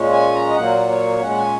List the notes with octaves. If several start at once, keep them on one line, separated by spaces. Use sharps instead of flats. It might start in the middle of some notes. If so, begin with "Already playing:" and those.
Already playing: A#2 G#3 C#4
G#5
A#5
D#5
A#2 F#3 A#3 F#5
C#5
A#2 G#3 C#4 F#5
G#5